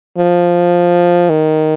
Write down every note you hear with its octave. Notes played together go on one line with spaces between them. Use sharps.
F3
D#3